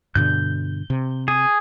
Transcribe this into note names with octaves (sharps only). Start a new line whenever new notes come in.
G2 B2 D3 G6
C3
G#4